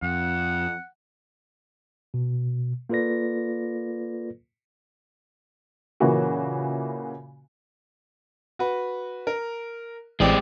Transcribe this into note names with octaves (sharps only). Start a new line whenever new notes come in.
F2 F#5
B2
A#3 F4 A4 B4 D5 A#6
A#2 C#3 E3 A#3 F#4
F#4 B4
A#4
A1 G#3 C4 G4 D5